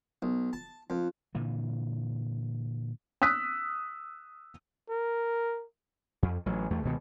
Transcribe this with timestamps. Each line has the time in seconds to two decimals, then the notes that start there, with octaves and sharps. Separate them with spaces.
0.22 B1
0.53 A5
0.90 F2
1.35 A#2 D3 E3
3.22 D#6 E6 F#6 B6
4.89 A#4
6.23 F2
6.46 A1 F#3
6.70 E2 A3
6.83 C#2 B2 D#3